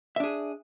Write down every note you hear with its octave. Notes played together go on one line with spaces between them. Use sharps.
D4 G#4 E5